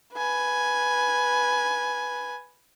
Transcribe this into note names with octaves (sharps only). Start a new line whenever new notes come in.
B4 G#5